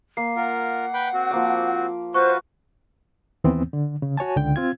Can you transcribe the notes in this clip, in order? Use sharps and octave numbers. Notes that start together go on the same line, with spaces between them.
A#3 C7
F4 A#4 F#5
B4 G5 B5
C4 F#4
F3 A#3 D6
F4 F#4 B4 C5 C#6 F#6
D#2 E3 B3 C4
D3
C#3
F#4 C#5 G#5 A5
C#2 D3 G5
C4 F4 G#6